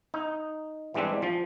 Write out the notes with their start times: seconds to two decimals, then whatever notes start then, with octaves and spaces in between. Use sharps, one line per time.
0.14 D#4
0.94 E3 G3 G#3 C4 D4
1.22 F3